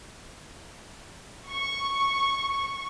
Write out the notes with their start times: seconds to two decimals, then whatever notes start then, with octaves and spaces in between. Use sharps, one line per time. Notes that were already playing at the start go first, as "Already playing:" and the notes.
1.49 C#6